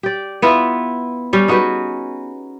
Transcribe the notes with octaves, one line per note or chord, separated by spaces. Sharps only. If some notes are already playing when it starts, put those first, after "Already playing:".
G4 D5
B3 E4 F4 B4
G3 C#4 G4
D#4 F#4 G#4 B4